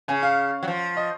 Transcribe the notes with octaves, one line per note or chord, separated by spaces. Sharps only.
C#3 G#5
F5
F#3
F3
D#5